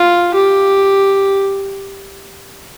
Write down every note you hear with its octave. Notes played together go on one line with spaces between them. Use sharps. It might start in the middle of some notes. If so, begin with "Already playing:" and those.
Already playing: F4
G4